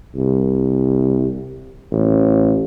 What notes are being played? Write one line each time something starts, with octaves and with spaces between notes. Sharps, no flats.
C2
A1